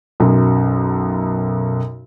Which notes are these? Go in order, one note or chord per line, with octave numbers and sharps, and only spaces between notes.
B1 F#2